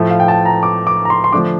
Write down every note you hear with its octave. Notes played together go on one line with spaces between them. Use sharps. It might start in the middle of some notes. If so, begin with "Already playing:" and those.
Already playing: A2 F3 A3
F5
G5
A5
A#5
D6
D6
A#5
C6
C6
D3 F3 A3 D4 D6